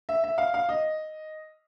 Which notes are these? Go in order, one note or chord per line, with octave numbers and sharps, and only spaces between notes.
E5
E5
F5
F5
D#5